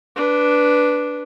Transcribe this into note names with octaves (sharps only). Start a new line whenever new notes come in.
D4 B4